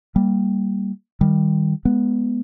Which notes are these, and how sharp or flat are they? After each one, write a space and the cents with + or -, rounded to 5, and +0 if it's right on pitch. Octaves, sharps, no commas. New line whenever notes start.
G3 +0 A#3 +0
D#3 +0 G3 +0
G#3 +0 B3 -10